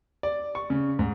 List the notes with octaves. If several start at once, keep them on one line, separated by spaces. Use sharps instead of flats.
D5
C#6
C#3
G#2